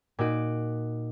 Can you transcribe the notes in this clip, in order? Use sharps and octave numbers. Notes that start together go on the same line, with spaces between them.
A#2 D#4 F#4 D7